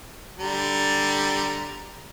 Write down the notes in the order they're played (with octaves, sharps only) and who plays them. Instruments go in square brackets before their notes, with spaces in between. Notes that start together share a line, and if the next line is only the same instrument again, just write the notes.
[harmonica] D3 G3 A#5